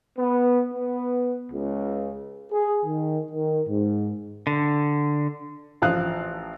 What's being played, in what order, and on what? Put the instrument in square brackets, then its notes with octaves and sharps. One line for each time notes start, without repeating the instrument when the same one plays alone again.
[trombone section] B3
B3
C#2
G#4
D#3
D#3
G#2
[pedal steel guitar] D3
[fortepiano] A1 F3 F5 D#6 F#6